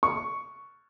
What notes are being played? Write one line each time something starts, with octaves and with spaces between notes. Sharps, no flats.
C#6